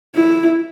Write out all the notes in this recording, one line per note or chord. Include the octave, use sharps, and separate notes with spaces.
E4